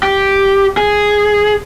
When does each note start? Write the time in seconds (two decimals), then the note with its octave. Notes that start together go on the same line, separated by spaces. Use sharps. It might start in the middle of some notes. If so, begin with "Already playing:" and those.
0.03 G4
0.77 G#4